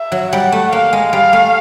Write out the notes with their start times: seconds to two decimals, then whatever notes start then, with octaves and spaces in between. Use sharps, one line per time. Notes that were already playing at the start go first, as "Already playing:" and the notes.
Already playing: E5
0.12 F#3
0.32 G3 F#5
0.52 A3
0.73 A#3 F5
0.93 G#3
1.12 G3 F5
1.33 A3